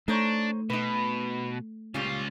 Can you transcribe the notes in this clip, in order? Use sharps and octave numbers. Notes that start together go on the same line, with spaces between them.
A3 D4 D#4 C5 C#5
B2 D#4 B4
C#2 A#2 G3 C#4 F4